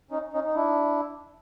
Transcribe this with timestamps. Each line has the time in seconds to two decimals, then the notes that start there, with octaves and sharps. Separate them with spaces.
0.11 C#4 D#4
0.33 C#4 D#4
0.45 D#4
0.55 D4 E4